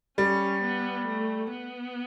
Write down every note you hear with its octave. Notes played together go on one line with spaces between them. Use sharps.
G3 C#4
B3
A3
B3